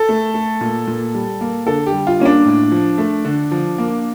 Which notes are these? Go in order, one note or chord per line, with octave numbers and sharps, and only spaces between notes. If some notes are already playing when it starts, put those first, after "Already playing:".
Already playing: A4
A3
A3
A#2
A#2
G3
A#3
D3 A4
G4
G3
F4
A#3 C#4
D4
A2
F3
A3
D3
F3
A#3